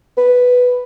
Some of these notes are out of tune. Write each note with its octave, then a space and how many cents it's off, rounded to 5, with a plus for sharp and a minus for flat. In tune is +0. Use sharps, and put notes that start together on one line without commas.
B4 +0